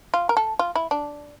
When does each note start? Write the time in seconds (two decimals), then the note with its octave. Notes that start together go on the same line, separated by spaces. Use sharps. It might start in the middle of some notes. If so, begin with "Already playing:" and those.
0.14 F4
0.29 A#4
0.37 A4
0.59 F4
0.75 E4
0.91 D4